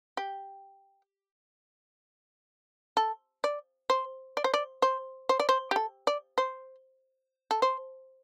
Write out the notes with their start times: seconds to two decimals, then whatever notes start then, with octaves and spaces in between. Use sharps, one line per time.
0.17 G4
2.97 A4
3.44 D5
3.90 C5
4.37 D5
4.44 C5
4.54 D5
4.82 C5
5.29 C5
5.40 D5
5.49 C5
5.71 G4
5.76 A4
6.07 D5
6.38 C5
7.51 A4
7.62 C5